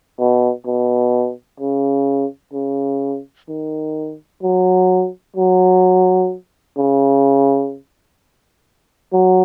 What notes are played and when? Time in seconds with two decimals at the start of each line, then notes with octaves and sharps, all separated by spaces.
0.19 B2
0.66 B2
1.60 C#3
2.53 C#3
3.49 D#3
4.43 F#3
5.36 F#3
6.78 C#3
9.13 F#3